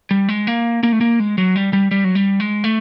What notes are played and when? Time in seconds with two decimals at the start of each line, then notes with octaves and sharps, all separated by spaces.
0.11 G3
0.29 G#3
0.47 A#3
0.83 A#3
0.92 A3
1.01 A#3
1.20 G#3
1.38 F#3
1.56 G3
1.73 G3
1.91 G3
2.04 F#3
2.15 G3
2.40 G#3
2.64 A3